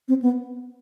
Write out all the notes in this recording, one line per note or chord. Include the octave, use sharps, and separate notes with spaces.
C4
B3